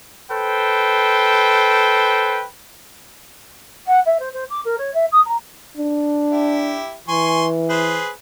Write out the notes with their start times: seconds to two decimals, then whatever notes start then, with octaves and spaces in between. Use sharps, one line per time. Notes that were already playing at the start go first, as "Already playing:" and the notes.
0.32 A4 B4 C5 G5
3.86 F#5
4.05 E5
4.19 C5
4.33 C5
4.49 D6
4.65 A#4
4.77 C#5
4.93 E5
5.12 D#6
5.25 A#5
5.77 D4
6.31 E4 G4
7.08 E3 G#5 C6 C#6
7.69 G#4 B4 C5